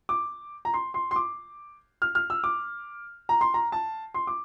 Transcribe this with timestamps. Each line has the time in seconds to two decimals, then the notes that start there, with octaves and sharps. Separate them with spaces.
0.09 D6
0.65 A#5
0.74 C6
0.94 C6
1.11 C6
1.16 D6
2.02 F6
2.15 F6
2.30 E6
2.44 D6
3.29 A#5
3.41 C6
3.54 A#5
3.72 A5
4.14 C6
4.27 D6